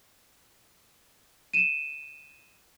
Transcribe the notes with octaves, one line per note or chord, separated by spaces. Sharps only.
D#7 E7